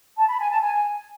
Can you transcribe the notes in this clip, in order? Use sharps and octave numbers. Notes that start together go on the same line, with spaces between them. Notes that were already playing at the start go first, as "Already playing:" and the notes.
A5
B5
G#5
A5
G#5